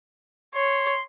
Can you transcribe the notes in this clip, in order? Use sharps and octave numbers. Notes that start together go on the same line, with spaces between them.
C#5 C6